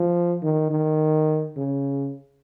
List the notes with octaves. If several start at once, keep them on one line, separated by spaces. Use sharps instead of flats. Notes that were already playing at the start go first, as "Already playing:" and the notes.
Already playing: F3
D#3
D#3
C#3